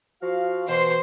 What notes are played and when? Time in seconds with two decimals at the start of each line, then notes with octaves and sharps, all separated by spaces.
0.22 F3 F#4 F5
0.68 B2 E3 C5 C6